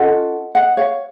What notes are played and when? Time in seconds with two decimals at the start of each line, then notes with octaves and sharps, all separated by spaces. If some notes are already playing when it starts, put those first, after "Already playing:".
Already playing: C#4 F4 A4 D#5 F#5
0.55 D#5 F#5
0.77 C#5 F5